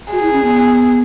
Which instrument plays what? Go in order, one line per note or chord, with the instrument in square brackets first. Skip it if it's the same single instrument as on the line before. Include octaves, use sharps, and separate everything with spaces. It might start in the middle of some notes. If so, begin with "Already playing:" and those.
[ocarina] F#4 [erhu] G#4
[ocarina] E4
C#4
B3